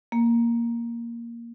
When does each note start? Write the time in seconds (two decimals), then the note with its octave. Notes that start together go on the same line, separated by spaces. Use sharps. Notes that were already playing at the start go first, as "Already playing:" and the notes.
0.12 A#3